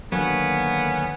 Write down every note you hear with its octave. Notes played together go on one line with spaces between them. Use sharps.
D3 D#3 F#3 A#3 B3 C#4 C#5